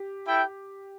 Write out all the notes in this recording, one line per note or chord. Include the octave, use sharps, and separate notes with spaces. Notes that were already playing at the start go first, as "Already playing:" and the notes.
Already playing: G4
E4 A4 E5 G5